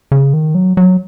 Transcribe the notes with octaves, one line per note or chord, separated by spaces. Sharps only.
C#3
D#3
F#3
F#3